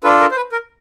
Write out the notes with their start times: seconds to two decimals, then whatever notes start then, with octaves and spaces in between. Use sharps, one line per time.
0.04 D4 F4 A4 B4
0.20 A#4
0.31 C5
0.36 B4
0.52 A#4